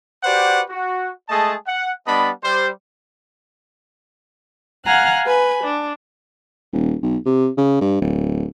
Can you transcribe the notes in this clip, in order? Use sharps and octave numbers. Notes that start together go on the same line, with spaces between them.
F#4 G4 B4 C5 D5 F#5
F#4
G#3 A3 G#4 D#5 A5
F#5
G3 B3 D4 D#5 A5 B5
G3 C5
F5 F#5 G#5 A#5 F6 F#6
B4 G#5 B5
D4
D#1
B1
C3
C#3
G2
D1